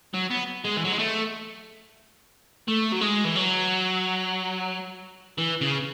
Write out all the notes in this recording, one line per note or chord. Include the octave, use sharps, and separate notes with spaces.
F#3
B3
G#3
E3
F#3
G#3
A3
A3
F#3
G#3
E3
F#3
E3
C#3